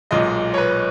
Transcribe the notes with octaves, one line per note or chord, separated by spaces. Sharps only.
B1 A#2 G#3 D#5
C#5
B4